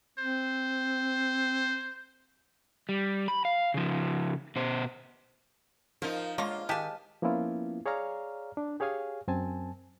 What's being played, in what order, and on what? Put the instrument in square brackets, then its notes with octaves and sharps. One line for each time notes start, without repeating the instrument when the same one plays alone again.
[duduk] C4 [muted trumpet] C5
[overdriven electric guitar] G3
B5
F5
C#3 F3
B2 C5
[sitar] F3 D#4 [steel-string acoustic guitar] A#4
[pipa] D3 C#5 A#5 [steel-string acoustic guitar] G#3 A#3 [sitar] F4
[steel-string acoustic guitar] D#3 G#5 [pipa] G#3 G4 A5
[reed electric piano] F3 A#3 B3 C#4 E4 F4
G#4 C#5 D5 F5 A#5 F6
D4
G4 G#4 C#5 F5 G#5
F#2 C4 G#5 A5